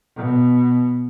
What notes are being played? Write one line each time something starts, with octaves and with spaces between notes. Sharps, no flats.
B2